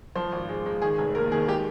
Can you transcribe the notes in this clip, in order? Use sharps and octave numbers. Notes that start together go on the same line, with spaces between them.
F3 C5
G#1
G#3
G#3
D#3 G#4
F1 G#4
D#2 A#4
D#3 G#4
G#3 G4